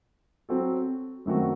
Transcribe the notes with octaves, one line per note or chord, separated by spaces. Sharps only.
F#3 C4 F#4 A4
F#2 D#3 A3 C4 F#4